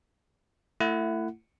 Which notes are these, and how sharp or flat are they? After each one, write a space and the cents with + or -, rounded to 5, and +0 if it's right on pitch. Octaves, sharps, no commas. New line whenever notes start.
A3 +25 E4 +20 F#5 +0